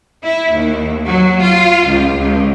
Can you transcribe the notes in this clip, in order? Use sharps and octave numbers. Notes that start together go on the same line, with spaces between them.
E4
D#2
F#3
F4
C#2
C#2